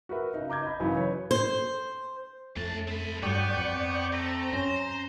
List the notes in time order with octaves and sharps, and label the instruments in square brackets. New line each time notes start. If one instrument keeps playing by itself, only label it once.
[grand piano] F#4 A#4 B4 E5
C#3 D#4
A#5 D6 G6 G#6
D#5 B5
F#2 C#3 E3 F#3 D#4 B5
B4 C#5
[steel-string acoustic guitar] C5
[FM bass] F2 [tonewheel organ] A3 [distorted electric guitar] C#4 A5
[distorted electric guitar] C4 B5
[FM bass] G2 [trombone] F#3 [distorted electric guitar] B3 [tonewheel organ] D5 G5 C#6
[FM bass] F2 [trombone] C4
[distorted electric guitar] A3 [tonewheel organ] A#5
[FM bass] F#2 [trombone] C#4 [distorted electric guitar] C5